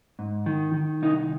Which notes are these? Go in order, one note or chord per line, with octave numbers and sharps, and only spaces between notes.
G#2
D#3
D#3
C2 D#4